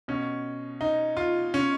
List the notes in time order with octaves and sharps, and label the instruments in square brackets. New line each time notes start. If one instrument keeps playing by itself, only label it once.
[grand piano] B2 C#4
D#4
F4
C#4